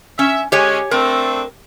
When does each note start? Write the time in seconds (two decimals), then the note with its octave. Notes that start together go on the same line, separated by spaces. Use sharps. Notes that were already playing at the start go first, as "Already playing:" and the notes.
0.19 C#4 E5
0.52 D3 G#3 C#4 G4 C#5 G#5
0.91 A3 C4 D4 A#4